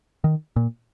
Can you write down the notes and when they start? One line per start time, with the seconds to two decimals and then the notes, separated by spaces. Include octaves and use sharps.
0.24 D#3
0.56 A#2